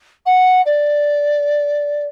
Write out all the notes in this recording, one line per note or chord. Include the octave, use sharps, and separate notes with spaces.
F#5
D5